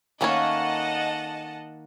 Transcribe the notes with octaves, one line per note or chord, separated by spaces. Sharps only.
D#3 A3 A#3 C#4 C#5 D#5 F#5 A5